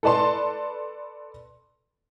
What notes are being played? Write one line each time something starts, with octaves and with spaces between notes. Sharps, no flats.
A4 B4 D5 A5 C6